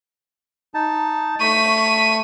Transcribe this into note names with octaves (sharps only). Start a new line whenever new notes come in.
D#4 A5
A3 C#6 B6 D#7